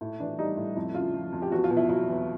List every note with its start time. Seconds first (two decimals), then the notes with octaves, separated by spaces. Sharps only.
0.01 A2
0.20 E3 D4
0.39 G3 D#4
0.57 A2
0.76 F2 E4
0.94 C#3 F4
1.14 F3
1.32 F2
1.42 G4
1.51 E2 F#4
1.64 F4
1.70 B2
1.77 E4
1.89 F#3 E4
2.09 E2